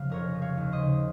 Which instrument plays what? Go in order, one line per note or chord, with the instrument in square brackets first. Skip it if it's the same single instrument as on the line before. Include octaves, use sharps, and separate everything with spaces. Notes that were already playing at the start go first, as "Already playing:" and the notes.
Already playing: [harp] C#3 F3 F5
F1 A#4 C#5
F3
C#5 F5
D#2
C5 D#5
C#3